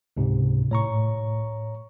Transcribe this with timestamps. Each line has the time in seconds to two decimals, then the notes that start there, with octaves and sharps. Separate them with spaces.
0.17 C#2 G#2 C3
0.71 A2 C#5 A#5 C#6